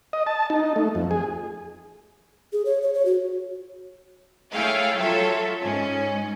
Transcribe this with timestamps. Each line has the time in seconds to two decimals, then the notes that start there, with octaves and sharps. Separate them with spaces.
0.13 D#5
0.27 A5
0.50 D#4
0.76 A3
0.95 F2
1.11 G#4
2.53 G#4
2.65 C#5
2.82 C#5
2.94 C#5
3.05 F#4
4.53 A3 E4 G#4 C#5 F5 G5
4.98 F#3 F4 A4 C#5 E5
5.62 G#2 C#4